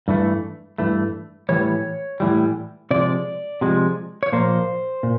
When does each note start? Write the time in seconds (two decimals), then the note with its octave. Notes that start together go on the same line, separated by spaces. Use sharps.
0.08 G2 E3 A3
0.78 G2 E3 A3
1.49 A2 E3 G3 C#5
2.20 A2 E3 G3
2.91 C3 F3 G#3 D5
3.61 C3 F3 G#3
4.23 C#5
4.32 A#2 F3 A#3 C5
5.03 A#2